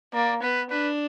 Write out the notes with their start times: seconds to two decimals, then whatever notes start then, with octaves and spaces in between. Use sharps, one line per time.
0.13 A#3 D5
0.42 B3 B4
0.70 D4 B4